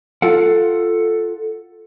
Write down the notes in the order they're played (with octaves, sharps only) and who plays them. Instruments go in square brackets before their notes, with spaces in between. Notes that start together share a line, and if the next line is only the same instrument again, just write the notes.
[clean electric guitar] F4 A4 F5 F#5